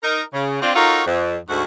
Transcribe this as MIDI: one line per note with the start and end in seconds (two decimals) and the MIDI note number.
0.03 0.22 63
0.03 0.22 70
0.33 0.59 49
0.62 0.75 60
0.62 0.75 62
0.62 0.75 65
0.76 1.02 63
0.76 1.02 65
0.76 1.02 66
0.76 1.02 69
0.76 1.02 70
0.76 1.02 73
1.07 1.37 41
1.49 1.64 38
1.49 1.64 44
1.49 1.64 66